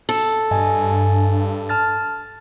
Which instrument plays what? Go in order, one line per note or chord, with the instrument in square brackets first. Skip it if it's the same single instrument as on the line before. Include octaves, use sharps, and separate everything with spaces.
[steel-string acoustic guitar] A4
[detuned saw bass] G2 [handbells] D#5 G#5
[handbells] A5 F6 A6